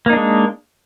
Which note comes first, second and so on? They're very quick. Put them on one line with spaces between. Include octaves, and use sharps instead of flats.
A#3 D#4 D4 G#3